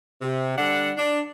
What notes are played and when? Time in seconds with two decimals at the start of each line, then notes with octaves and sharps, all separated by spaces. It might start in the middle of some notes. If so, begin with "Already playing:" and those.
0.22 C3
0.58 D3 G3 D4 F#5
0.98 D4